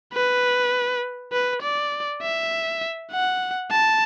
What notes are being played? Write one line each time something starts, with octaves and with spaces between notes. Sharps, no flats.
B4
B4
D5
E5
F#5
A5